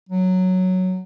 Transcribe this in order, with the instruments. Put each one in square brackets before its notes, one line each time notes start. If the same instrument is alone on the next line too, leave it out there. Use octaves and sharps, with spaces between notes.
[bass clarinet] F#3